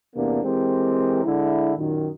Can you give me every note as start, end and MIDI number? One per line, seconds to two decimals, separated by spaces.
0.15 0.40 40
0.15 0.40 48
0.15 0.40 58
0.15 0.40 59
0.15 0.40 62
0.44 1.22 52
0.44 1.22 56
0.44 1.22 60
0.44 1.22 67
0.44 1.22 70
1.25 1.72 50
1.25 1.72 56
1.25 1.72 64
1.77 2.08 42
1.77 2.08 46
1.77 2.08 51